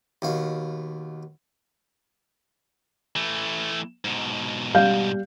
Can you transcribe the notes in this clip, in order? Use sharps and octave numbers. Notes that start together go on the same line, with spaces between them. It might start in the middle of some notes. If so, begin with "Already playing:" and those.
D#2 B2 F5
E3 A3
G#2 B2
G3 F5 G6